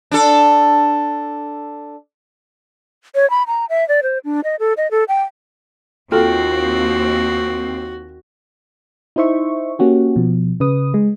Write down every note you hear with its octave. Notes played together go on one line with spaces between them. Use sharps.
D4 A4
C#5
B5
A#5
E5
D5
C5
D4
D#5
A4
D#5
A4
G5
D#2 C4 F4 F#4 A4 G5
D#4 E4 C5 E5 C#6
A#3 C#4 F#4 G4
B2 F3
C#3 B4 D#6
G#3